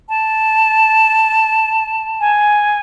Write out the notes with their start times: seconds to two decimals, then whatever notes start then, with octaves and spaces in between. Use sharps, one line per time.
0.08 A5
2.21 G#5